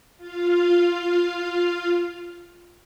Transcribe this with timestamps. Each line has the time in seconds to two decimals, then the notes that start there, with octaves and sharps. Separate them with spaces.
0.17 F4 F5